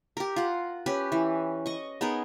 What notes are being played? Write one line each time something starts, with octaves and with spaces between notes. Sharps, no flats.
G4 A#4
F4 F#5
C#4 G4 B4
E3
D#5 C#6
B3 D#4 G#4 A#4